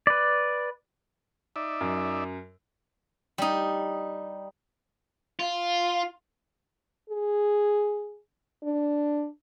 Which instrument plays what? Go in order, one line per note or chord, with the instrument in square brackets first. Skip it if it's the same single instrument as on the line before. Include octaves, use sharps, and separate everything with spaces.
[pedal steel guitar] B4 D5
[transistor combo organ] D#4 D5 E5
[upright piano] F#2
[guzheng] G3 D#4
[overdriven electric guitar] F4
[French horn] G#4
D4